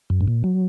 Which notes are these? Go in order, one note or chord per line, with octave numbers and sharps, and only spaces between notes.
F#2
G#2
A#2
F#3